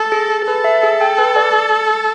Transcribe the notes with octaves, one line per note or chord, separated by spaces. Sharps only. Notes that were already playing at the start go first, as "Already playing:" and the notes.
Already playing: A4
G#4
G#4
A4 B4
E5
G#4
G5
B4
D5